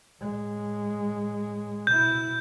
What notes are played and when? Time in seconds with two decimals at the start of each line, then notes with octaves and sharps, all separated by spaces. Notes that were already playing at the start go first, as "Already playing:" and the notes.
0.21 A2 G#3
1.87 B2 E4 G6